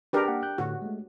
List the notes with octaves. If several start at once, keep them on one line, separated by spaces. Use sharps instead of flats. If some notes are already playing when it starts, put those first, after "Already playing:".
D4 G4 G#4 A#4 B4
A#3 F#5 G5
G5 F#6 G6
A2 D3 F#4
G#3 A3